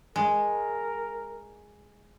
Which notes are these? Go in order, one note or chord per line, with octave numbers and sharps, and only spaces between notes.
G#3 A#4